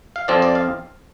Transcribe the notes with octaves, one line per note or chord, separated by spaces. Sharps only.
F5
F2 F3 C4 D5
D5
F5